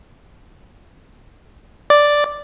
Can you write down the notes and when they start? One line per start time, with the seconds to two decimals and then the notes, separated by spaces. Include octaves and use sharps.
1.90 D5